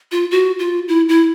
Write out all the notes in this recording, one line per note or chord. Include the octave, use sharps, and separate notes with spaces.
F4
F#4
F4
E4
E4